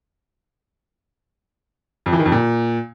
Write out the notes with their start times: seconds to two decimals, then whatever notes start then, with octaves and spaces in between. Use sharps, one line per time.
2.06 F2
2.12 E3
2.19 D#3
2.25 F2
2.32 A#2